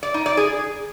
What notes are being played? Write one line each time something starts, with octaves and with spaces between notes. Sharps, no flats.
D5
D#4
D5
G#4